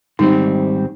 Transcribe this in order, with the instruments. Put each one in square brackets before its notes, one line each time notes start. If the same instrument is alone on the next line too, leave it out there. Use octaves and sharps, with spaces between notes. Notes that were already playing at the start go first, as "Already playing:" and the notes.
[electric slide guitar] G#2 D#3 G3 C4 [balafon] D#4